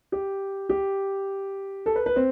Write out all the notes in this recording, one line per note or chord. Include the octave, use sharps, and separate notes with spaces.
G4
G4
A4
B4
B4
C4